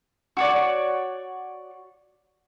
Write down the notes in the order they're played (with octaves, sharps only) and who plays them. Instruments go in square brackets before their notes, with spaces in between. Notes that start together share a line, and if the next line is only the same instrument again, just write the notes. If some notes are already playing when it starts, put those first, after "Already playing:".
[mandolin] F#4 C#5 D5